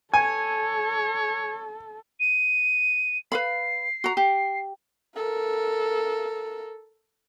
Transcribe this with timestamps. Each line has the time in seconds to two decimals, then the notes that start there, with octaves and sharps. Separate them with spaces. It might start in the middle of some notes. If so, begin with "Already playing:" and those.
0.14 A4 C#5 G#5
2.20 D#7
3.32 B4 F5 B5 C7
4.04 F#4 A#5
4.17 G4
5.16 A4 A#4